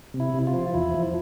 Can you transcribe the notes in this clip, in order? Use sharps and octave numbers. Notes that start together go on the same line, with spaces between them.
C3
E4
C3
F4
F3
E2 E4
F3